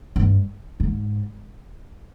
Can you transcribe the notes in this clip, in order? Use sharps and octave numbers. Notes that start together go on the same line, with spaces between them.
G2
G#2